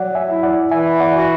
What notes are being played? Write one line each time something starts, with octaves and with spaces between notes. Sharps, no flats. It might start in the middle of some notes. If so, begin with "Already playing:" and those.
Already playing: F#3 D5 F#5
E5 G#5
E4
D5 F#5
E3 E5 G#5
D5 F#5
F#4